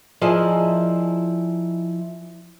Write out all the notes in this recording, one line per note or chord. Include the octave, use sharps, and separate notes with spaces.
F3 E4 G#4 A#4 D5 D#5